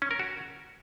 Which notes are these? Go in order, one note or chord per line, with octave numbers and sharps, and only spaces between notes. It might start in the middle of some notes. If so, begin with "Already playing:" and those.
C#4
A#4
F#4